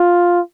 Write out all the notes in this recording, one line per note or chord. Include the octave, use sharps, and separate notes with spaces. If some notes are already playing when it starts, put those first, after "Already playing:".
Already playing: F4